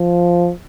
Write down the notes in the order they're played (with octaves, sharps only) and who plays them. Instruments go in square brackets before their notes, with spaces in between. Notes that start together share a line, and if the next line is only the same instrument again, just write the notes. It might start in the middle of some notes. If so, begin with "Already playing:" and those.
Already playing: [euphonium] F3